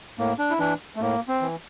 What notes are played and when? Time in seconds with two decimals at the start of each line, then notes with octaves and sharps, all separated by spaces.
0.18 A2 A#3
0.39 D4
0.50 E4
0.59 E3 D4
0.96 A3
1.01 A2 A#3
1.28 C4
1.41 E3